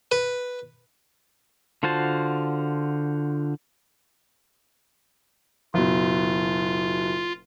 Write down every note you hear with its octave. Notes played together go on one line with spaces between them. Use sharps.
B4
D3 F4 F#4 C5 A5
F#1 B2 F4